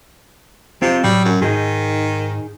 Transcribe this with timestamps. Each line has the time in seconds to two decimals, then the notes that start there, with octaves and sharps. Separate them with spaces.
0.82 C3 C4 F4
1.04 A2 F#3 G3
1.25 F#2
1.42 G#2 D#3 D#4 G#4